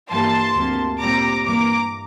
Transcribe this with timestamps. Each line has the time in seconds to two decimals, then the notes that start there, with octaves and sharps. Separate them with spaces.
0.11 G2 E3 G3 A#3 A5 C6
0.56 D2 C3 F3 A#3
1.00 A#2 G3 C4 A#5 D6
1.45 G2 E3 A#3 A#5 D6